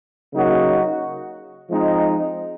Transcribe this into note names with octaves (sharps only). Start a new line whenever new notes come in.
C#3 F#3 A#3 D#4 F#4
F3 G#3 C4 D#4